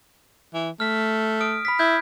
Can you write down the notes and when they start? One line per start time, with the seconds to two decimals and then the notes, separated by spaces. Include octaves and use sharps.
0.54 E3
0.80 A3 F6 B6
1.40 D#6 F6 D7
1.65 B5 F6 B6
1.79 E4 G6 G#6